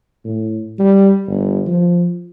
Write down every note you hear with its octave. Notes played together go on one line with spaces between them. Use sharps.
A2
G3
G1
F3